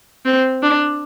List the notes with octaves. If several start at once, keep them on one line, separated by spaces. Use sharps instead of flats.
C4
D4